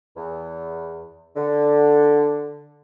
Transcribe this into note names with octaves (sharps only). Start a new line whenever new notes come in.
E2
D3